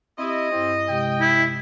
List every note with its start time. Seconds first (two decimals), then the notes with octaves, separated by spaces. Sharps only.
0.18 C4 E4 G4 D#5
0.51 G2 C4 E4
0.89 C3 G#3 G4 G5
1.21 E4